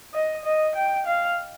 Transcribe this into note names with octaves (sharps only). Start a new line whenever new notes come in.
D#5
D#5
G5
F5